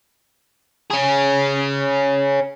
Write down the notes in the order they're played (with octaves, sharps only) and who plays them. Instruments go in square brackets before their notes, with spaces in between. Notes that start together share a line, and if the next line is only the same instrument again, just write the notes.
[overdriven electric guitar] C#4 G#4